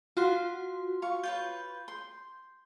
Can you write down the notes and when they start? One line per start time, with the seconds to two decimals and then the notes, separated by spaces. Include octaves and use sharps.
0.17 F4 F#4 F5 C6
1.02 F5 C#6
1.24 F4 B4 C#5 G6
1.88 C6